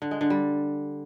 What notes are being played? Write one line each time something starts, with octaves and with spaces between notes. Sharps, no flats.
D3
G#3
D3
G3